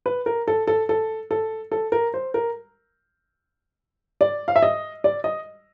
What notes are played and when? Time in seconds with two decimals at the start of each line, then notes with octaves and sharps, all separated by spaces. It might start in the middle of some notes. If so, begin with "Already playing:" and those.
0.06 B4
0.26 A#4
0.48 A4
0.67 A4
0.89 A4
1.31 A4
1.72 A4
1.92 A#4
2.14 C5
2.34 A#4
4.21 D5
4.48 F5
4.56 E5
4.62 D#5
5.04 D5
5.24 D#5